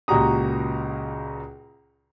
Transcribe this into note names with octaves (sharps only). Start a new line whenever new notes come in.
C#2 A#2 F#4 G4 A#5 D#6